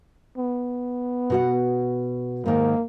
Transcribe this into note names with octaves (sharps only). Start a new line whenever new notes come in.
B3
B2 F#4 F#5
G#2 D#3 A#3